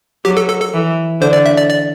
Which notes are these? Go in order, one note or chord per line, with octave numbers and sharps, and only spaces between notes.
F#3 G4
A4
A4
A4
E3
D3 C5
D5
E5
D5
D5